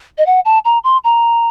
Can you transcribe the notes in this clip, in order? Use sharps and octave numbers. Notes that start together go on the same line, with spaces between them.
D#5
F#5
A5
A#5
C6
A#5